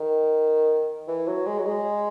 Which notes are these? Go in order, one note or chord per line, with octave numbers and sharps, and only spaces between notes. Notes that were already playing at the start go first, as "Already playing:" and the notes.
Already playing: D#3
E3
F#3
G#3
F#3
G#3